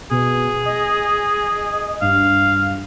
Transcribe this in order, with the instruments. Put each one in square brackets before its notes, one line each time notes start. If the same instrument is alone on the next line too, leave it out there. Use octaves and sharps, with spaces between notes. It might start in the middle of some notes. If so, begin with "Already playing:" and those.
[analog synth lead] B2 [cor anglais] G#4
[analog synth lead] D#5
[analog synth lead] G2 [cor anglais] F5